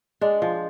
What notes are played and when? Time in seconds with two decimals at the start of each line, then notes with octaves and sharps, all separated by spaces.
0.21 G#3 D4
0.42 F3